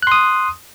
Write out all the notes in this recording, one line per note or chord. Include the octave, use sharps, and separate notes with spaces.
C6 D#6 F#6